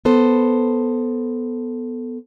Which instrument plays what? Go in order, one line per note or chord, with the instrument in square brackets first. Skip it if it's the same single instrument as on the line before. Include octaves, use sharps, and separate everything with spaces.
[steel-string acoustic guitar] B3 A4 C5